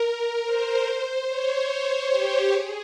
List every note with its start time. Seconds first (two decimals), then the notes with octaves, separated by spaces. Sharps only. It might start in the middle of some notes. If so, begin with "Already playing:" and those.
Already playing: A#4
0.44 C5
0.86 C5
1.27 C#5
1.68 C5
2.09 G4
2.51 G#4